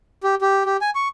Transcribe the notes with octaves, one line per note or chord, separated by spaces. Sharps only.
G4
G4
G4
G#5
C#6